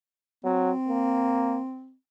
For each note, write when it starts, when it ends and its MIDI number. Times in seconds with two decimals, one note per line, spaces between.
0.44 0.71 54
0.44 1.94 60
0.89 1.62 58